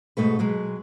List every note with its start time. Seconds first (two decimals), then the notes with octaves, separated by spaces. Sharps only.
0.17 G#2 B2 A3 B4
0.39 B2 F#3 G#3